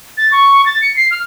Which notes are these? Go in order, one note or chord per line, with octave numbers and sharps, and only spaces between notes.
A6
C#6
A6
C#7
C7
F6